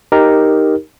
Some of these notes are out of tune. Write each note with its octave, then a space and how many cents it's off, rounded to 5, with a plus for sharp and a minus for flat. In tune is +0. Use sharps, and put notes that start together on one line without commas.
D#4 +0 G4 +0 A#4 +0